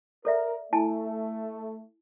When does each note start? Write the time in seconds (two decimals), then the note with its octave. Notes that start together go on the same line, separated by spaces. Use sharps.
0.25 A4 A#4 D5 E5
0.73 A3 E4 G#5 A5